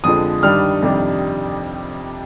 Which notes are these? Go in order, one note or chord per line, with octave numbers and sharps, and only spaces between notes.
F2 D3 F3 G#3 D#6
G2 D#3 G3 D4 F6
F2 C3 D#3 G3 D4